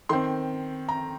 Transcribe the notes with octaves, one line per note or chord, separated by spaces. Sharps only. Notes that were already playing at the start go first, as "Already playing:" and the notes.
D#3 C4 C6
A#5